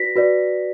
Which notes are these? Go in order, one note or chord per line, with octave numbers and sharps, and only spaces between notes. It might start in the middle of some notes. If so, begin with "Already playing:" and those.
Already playing: F#4 B4 D5 A#6 B6
F#4 B4 D5